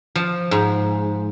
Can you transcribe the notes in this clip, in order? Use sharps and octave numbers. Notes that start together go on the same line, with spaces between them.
F3
G#2